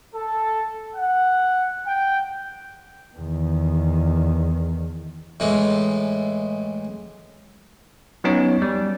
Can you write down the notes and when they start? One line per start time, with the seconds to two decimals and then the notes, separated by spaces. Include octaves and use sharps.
0.14 A4
0.96 F#5
1.86 G5
3.16 E2 D#3
5.40 A2 E3 G#3
8.24 F#3 B3 C#4 D#4 C#5
8.62 G3